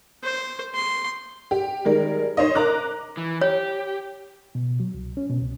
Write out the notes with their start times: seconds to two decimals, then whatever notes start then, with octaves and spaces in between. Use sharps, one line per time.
0.23 C5
0.74 C6
1.51 G4
1.85 D#3 G3 G#3 A#4
2.37 D#4 C5 C#5 D#5
2.55 A#4 D#5 A#5 D6 F#6
3.17 E3
3.41 G4 C#5
4.55 B2
4.80 F#3
4.94 C2
5.17 C#4
5.30 B2
5.41 C2